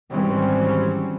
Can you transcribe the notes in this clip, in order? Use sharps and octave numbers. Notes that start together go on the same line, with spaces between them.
G#1 E3 F#3 G3 C4 C#4